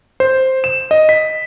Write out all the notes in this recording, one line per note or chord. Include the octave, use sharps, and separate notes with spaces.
C5
E7
D#5
B6